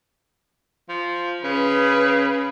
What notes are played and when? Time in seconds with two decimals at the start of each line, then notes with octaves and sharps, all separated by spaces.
0.89 F3
1.44 C#3 B4